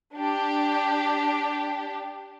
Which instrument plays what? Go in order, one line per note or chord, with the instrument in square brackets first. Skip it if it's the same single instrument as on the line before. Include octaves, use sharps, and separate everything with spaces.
[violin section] D4 G4